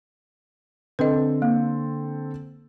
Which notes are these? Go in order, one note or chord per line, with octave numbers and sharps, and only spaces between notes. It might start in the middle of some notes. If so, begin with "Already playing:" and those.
D3 C4 A4 B4 D#5
A#3